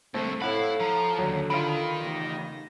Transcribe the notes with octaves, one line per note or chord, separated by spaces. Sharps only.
C2 D3 A3 C4
A2 E4 A4 F5 F#5 B5
F3 A#5
D#2 D3 F#3
D#3 F4 B5
E2 C#3 A#6